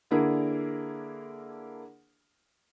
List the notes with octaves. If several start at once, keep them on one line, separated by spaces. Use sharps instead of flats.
D3 A#3 D4 E4 G#4 A#4